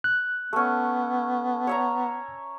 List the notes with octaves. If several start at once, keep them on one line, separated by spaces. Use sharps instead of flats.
F#6
A3 B3 C#4
C#5 E5 A#5